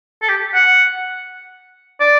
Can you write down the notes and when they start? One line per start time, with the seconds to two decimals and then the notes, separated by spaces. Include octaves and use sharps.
0.22 A4
0.29 G4
0.54 F#5
2.00 D5